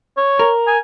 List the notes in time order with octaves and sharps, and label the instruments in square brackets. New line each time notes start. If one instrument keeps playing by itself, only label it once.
[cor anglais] C#5
[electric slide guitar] A#4
[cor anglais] G#5